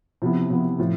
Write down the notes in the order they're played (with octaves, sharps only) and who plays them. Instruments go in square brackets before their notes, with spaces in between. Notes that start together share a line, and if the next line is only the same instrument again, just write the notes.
[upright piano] C3 F3 B3 E4
C3 F3 B3 E4
A2 F3